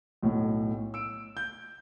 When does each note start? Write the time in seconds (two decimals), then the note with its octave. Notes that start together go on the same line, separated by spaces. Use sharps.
0.22 B1 A2
0.94 E6 D7
1.37 G6